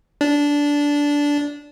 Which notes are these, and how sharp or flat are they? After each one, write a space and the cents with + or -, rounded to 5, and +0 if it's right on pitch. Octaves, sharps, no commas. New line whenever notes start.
D4 -15